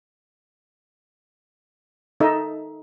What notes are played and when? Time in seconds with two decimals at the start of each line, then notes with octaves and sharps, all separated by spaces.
2.20 D#4 A4 D#5 E5